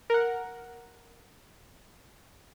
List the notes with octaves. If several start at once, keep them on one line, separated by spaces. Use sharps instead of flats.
A#4 F#5